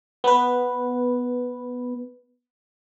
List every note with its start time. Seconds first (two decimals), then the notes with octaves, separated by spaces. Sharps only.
0.24 B3 B4